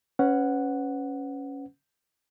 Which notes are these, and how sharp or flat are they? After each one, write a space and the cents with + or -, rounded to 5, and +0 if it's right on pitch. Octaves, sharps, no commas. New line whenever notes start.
C#4 +0 B4 +30 F#5 +0